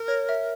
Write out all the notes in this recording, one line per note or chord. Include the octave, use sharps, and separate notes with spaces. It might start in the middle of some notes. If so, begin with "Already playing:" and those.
Already playing: A#4
C#5
E5